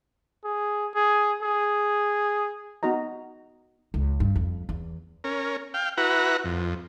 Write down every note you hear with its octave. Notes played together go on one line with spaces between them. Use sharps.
G#4
G#4
G#4
B3 D#4 F#4 D#5 A#5
C#2
G2
F2
E2
C#4 A#4
F5 G5
E4 F#4 B4 F#5 A#5
F2